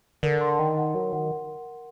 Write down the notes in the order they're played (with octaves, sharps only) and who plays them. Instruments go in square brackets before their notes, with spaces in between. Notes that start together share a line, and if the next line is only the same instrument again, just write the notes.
[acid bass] D3 [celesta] A#4
[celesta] C6
[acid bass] D#3 [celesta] A#4
[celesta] F#5
[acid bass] F#3 [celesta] A#4
[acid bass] D#3 [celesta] F#5